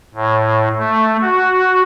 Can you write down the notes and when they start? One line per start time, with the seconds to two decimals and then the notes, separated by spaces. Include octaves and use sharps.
0.15 A2
0.79 A3
1.22 F#4